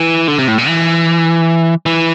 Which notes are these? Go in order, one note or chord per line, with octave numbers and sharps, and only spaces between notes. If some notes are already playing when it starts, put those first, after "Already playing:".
Already playing: E3
D3
C3
A2
A#2
E3
E3